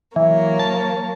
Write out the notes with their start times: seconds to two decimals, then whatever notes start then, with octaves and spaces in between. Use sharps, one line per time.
0.16 E3 F#3 A#3 C#5
0.59 A5